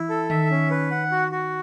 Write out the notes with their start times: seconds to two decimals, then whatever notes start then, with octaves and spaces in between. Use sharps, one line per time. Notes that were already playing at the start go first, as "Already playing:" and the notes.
Already playing: E3 E4
0.09 A4
0.30 D#3 E5
0.50 C#4
0.71 B4
0.91 F#5
1.12 F#4
1.31 F#4